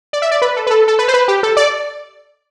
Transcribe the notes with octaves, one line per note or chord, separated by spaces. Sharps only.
D5
E5
D5
B4
A4
B4
A4
A4
B4
C5
B4
G4
A4
D5